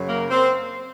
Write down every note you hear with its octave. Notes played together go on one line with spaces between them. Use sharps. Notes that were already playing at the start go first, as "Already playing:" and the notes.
Already playing: F#2 C#3 F#3
A#3 A#4
C4 C5